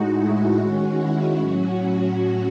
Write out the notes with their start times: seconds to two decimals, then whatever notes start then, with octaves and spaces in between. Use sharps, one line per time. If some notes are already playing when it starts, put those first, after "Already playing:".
Already playing: A2 G#3 D#4 F#4
0.18 E4
0.58 D#3 G#3 C#4 F#4
0.98 E4
1.40 A2 F#3 C#4 F#4
1.80 F#4